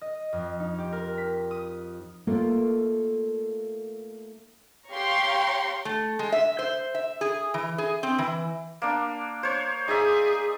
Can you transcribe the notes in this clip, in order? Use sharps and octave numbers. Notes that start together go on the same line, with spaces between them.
D#5
F2
D#4
G4
A#4
B6
D#6
A3 A#3 D#4 F4 A4 A#4
G4 C#5 F5 A#5 C6 C#6
A3
G#3
E5
C5
E5
G#4
E3
G#4
C4
E3
A#3 D4
C5 C#5
D#4 G#4 D5 E5